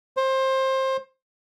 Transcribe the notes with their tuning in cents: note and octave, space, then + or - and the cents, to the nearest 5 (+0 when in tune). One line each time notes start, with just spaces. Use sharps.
C5 +20